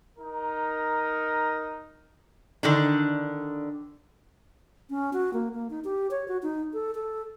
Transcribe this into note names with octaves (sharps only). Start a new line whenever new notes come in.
D#4 A#4
D3 D#3 D4
C#4
F#4
A#3
A#3
D#4
G4
C#5
F#4
D#4
A4
A4